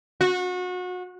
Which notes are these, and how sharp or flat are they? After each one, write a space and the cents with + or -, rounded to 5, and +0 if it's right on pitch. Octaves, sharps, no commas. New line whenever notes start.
F#4 -30